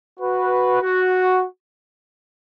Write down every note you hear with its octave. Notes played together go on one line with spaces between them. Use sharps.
F#4 B4
F#4